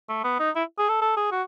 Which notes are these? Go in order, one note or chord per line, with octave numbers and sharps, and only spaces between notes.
A3
B3
D#4
E4
G#4
A4
A4
G#4
F#4